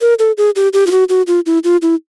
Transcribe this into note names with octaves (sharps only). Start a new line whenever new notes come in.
A#4
A4
G#4
G4
G4
F4
F#4
F#4
F4
E4
F4
E4